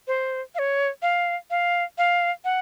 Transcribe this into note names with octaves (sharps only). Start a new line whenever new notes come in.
C5
F5
C#5
F5
F5
F5
F#5